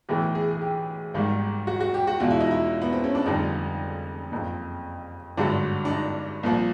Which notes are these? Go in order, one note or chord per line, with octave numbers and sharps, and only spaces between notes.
B1 A2 E3 A3 G4
G#4
G#4
G4
G#1 G#2 D#3 G3
F#4
F#4
G4
F#4
E2 B2 G#3 F4
E4
D#4
E4
B3
C4
C#4
D4
F1 F2 D3 G3 D#4
F#1 F2 C3
G#1 G2 D3 F#3 A3 D4
D4
D#4
C2 A#2 F3